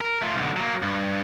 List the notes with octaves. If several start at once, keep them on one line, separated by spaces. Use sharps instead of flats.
A#4
A3 F4
B1 D3
F#3 A#3
G2